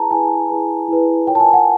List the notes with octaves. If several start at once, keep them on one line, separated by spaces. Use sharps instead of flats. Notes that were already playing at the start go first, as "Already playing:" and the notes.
Already playing: E4 G#4 B4 A5 A#5
E4 G#4 B4 G#5
E4 G#4 B4
E4 G#4 B4
F4 A#4 C#5 G5
A5
G#5
F#5